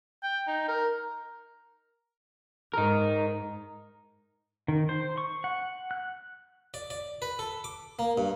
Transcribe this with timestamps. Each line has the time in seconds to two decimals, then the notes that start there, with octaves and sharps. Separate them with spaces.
0.23 G5
0.47 D#4
0.68 A#4
2.74 G#2 D#4 A#4
4.68 D#3
4.89 C5
5.18 C#6
5.44 F#5
5.91 F#6
6.74 D5
6.90 D5
7.22 B4
7.39 A4
7.64 D6
7.99 A#3
8.18 G2